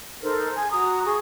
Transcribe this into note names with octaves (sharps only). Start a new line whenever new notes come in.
D#4 A4 A#4 C5
G#4 G#5
F#4 A#5 D#6
G#4 C#6 D#6